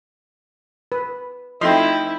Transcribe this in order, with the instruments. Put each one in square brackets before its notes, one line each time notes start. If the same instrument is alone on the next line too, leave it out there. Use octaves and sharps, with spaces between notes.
[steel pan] B4
[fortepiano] F3 A3 C4 [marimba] D#4 G5 [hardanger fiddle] E4 [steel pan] D#5 C6